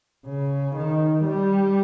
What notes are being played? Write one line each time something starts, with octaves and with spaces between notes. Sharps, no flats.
C#3
D#3
G3